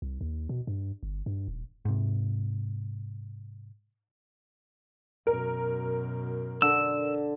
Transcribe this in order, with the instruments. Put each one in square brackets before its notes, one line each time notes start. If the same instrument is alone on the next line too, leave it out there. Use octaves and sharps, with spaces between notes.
[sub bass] C2
D#2
B2
G2
G1
G2
D#1
[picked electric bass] G#2 C3
[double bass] F#2 B2 [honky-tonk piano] A#4
[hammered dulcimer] D3 [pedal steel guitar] E6